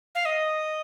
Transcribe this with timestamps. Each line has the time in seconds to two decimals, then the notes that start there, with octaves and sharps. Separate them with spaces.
0.15 F5
0.25 D#5